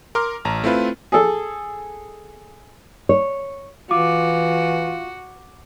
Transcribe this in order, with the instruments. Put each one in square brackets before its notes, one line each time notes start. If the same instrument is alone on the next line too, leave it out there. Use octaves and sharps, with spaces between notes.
[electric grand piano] A#4 C6 D6 F6
A1 A5 A#5
A3 C4 E4 F4 B4
[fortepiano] G#4 A4
[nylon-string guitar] C#5
[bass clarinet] E3 [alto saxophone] F4 [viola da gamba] F#4 [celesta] D6